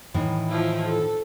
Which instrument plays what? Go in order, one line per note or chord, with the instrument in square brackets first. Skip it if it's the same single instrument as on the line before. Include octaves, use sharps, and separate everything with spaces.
[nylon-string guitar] A2 D#3 E3
[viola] F3 E4
A4